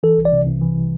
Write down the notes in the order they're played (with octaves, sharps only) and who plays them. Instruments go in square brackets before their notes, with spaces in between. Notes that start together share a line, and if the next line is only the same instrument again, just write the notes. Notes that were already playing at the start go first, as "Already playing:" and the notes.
[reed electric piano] E3 [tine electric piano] A4
[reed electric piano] C2
[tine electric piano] D5
[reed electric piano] C3
C2
E3